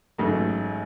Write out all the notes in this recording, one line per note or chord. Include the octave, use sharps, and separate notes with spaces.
A1 G#2 F#3 A3